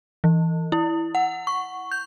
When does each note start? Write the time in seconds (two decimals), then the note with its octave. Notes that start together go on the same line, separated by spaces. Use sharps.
0.24 E3
0.72 E4
1.15 F#5
1.47 C#6
1.91 G6